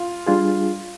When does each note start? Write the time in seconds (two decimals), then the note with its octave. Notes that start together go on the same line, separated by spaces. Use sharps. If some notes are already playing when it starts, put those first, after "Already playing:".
Already playing: F4
0.26 G3 D4 F4 G#4